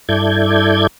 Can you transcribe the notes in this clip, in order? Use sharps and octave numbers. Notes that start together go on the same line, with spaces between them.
G2 E4 A4 D5 G6 G#6